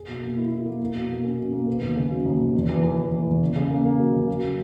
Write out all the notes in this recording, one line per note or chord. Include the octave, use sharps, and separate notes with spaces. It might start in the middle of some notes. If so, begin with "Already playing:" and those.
Already playing: G#4
B2
A#3
E4
E4
A#3
A#3
B2
A#3
C#4
B2
A#3
B3
D#2
C#3
F#3
D#2
D#2
E2
E3
E3
E3
E3
E2
C#3
C#3
A#3
A#3
F#3
C#3
F#3